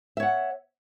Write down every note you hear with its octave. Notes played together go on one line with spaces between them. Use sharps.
C#5 E5 F#5